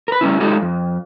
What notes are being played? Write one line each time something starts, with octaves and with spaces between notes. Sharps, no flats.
A#4 B4
G3 A3 C#4 E4
G#3 D#4 F4 G4 A4
F2